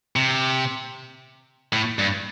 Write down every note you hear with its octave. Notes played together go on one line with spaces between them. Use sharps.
C3
A2
G2